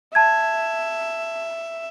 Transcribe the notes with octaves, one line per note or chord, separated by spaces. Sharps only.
E5 A5 G#6